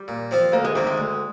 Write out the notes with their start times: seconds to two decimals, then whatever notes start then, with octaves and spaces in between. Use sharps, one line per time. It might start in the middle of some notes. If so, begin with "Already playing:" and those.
Already playing: G3
0.08 A#2
0.31 F3 C4 F4
0.52 D2 A#3
0.64 G#3
0.75 C3 D#3 G3 A#3
0.87 G#3
0.98 D2